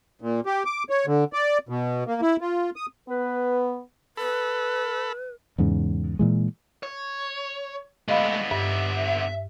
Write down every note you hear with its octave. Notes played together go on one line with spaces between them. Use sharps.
A#2
G4
D6
C#5
D3
D5
B2
A#3
E4
F4
D#6
B3 B4
A4 B4 B5
E2 G#2 C#3
A#2 E3 G#3
C#5
D3 G#3 A3 B3 D#5 F5 B5
G2 E5